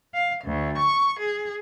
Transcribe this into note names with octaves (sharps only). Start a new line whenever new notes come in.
F5
D2
C#6
G#4